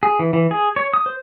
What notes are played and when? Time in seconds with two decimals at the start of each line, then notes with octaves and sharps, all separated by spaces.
0.03 G#4
0.19 E3
0.33 E3
0.51 G#4
0.76 C#5
0.94 D#6
1.06 C5